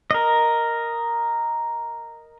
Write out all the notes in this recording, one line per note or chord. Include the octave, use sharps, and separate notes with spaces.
A#4 D#5